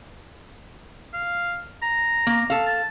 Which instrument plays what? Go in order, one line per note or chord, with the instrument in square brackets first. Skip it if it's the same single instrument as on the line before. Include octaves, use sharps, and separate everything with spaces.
[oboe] F5
A#5
[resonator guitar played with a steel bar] A#3
A4 F5
[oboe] A5